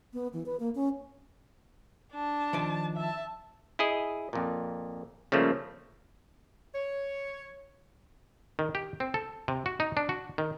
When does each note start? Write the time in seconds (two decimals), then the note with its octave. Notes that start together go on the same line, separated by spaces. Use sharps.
0.13 B3
0.33 E3
0.46 B4
0.60 A#3
0.75 C#4
2.12 D4 A5
2.53 D#3 F3 D5
2.96 E5 A5
3.79 E4 G#4 D#5
4.33 F2 A#2
5.32 C#3 F3 G3 A3 A#3
6.75 C#5
8.59 D#3
8.75 G4
9.00 C4
9.14 A4
9.48 C3
9.66 F#4
9.80 D#4
9.97 D4
10.09 F#4
10.38 D#3